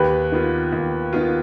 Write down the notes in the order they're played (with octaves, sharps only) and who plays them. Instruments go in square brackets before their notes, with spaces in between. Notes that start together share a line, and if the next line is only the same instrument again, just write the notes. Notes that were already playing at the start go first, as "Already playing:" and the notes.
Already playing: [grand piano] D#2 [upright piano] G4 B4
[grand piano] D#3 B3 F4
D#2
D#3 B3 F4